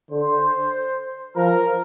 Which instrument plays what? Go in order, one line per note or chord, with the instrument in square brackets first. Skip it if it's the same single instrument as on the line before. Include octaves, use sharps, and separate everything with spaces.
[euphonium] D3 [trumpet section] C5
[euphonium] F3 [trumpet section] A#4